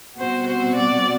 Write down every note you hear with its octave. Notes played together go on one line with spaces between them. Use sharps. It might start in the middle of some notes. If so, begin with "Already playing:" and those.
B2 G3 C4 F#4 C5
C5
D5